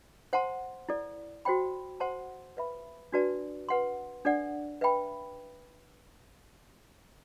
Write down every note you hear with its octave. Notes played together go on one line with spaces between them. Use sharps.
C5 F#5 A5 C6
E4 A4 D5
F#4 C5 G5 B5
C5 F#5 A5 C6
B4 E5 B5
D4 F#4 B4 D5 A5
B4 F#5 C6
D4 A4 D5 F#5
B4 E5 G5 B5